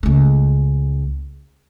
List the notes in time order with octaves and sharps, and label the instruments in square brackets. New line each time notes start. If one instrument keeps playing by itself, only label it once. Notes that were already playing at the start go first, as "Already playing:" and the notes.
[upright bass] C#2 A3